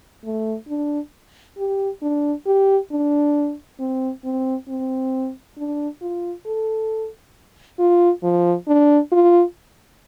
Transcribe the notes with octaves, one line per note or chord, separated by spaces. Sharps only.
A3
D4
G4
D4
G4
D4
C4
C4
C4
D4
F4
A4
F4
F3
D4
F4